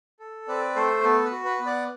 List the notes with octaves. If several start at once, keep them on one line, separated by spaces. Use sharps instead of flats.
A4
C4 B4 D5
A3 A4 C5
B3 A4
B4
F#4
B4
B3
D5 F#5